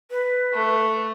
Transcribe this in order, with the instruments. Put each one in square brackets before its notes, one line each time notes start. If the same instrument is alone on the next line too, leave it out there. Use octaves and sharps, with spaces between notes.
[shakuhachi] B4
[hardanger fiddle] A3